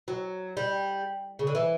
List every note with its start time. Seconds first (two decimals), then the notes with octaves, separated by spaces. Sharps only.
0.08 F#3
0.57 G3
1.39 C#3
1.47 D3
1.55 E3